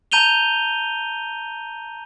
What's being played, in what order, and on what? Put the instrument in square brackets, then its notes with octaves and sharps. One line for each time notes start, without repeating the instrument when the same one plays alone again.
[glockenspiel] A5 A#5 G6 D#7 F7 G7